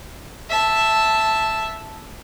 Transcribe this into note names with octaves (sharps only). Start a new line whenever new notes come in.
E5 A5